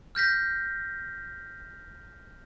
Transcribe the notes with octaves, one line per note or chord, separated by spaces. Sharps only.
F6 G6 A#6 B6